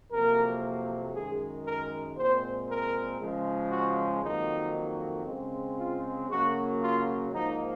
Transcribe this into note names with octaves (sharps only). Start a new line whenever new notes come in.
F2 C3 F#3 A#3 A#4
F#2 D#3 G#3 G#4
A#4
A#2 G#3 C4 C5
A#4
C#3 F3 G#3
F#4
F2 D#3 F#3 A#3 D#4
C#3 G#3 C4
F4
C#3 F#3 A#3 F#4
F4
G#2 F3 A#3 D#4